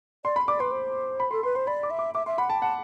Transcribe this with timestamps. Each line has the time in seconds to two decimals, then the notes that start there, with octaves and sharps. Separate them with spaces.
0.25 D5 C6
0.36 B5
0.48 D5 D6
0.60 B4 C6
0.72 C5
1.20 B5
1.31 A4 C6
1.43 B4 C6
1.55 C5 C6
1.67 D5 B5
1.83 D6
1.90 E5
1.99 D6
2.15 E5 D6
2.26 E5 C6
2.38 F#5 B5
2.50 G5 A5
2.62 F#5 A5